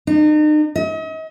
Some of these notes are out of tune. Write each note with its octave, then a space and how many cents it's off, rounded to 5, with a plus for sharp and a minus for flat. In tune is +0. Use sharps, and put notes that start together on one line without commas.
D#4 -40
D#5 +40